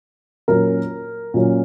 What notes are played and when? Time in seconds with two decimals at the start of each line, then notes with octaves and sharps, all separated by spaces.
0.48 A#2 F#3 C#4 A#4
1.34 A#2 F#3 C#4